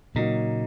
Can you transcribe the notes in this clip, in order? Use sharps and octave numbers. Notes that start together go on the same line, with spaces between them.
A#2 C#3 F#3 A#3 D#4